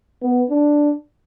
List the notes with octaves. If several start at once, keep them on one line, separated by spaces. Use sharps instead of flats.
B3
D4